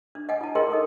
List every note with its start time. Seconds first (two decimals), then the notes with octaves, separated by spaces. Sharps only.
0.15 D4
0.29 D#5 F#5 G#5
0.41 E4 A5
0.55 F4 G#4 A#4 D#5 G5 C6
0.70 D#4 A4 D#5